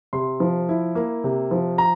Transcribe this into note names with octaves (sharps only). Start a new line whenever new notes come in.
C3 C6
F3
E4
A#3
C3
F3
A#5